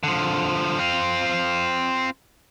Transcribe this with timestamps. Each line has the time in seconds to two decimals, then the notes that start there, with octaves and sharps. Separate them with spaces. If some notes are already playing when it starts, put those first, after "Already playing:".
0.03 D3 F3
0.78 C4 F4